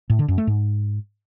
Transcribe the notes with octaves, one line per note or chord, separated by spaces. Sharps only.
A2
D3
F#2
A3
G#2